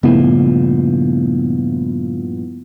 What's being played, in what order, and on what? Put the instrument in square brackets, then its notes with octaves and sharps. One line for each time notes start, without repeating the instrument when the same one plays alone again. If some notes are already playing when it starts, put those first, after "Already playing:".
[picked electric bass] G2 A#2 F3 [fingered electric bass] C#3 A3 [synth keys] B3 E4